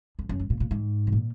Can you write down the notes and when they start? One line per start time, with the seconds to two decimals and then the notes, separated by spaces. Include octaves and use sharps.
0.19 F2
0.29 F#2
0.40 G#2
0.50 A#2
0.60 A#2
0.71 G#2
1.07 B2
1.12 A#2